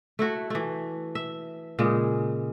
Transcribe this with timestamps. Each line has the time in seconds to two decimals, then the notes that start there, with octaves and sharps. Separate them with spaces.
0.19 A3 E4 F#4
0.50 E3 A3
1.15 E5
1.79 A#2 C#3 G#3